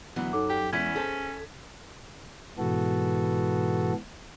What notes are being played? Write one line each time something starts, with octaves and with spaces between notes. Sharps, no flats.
D2 E3 F#3 B3
F#2 D#4 A4 D6
G4
E2 G#3 C#4 E4 E5 G#6 B6
G#4 A4 C5 A5
G#2 B2 E3 B3 F#4 A4